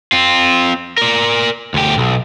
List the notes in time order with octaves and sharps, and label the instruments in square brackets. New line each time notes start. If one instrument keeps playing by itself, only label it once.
[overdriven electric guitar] C4 F4
A#4 D5
D2 G4
B1